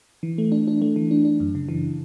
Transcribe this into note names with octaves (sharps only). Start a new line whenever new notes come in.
E3
A3
D4
D4
A3
E3
D4
D4
F#2
C#3
E3